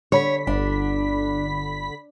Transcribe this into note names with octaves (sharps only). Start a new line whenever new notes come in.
D3 C#5 B5 B6
G1 D4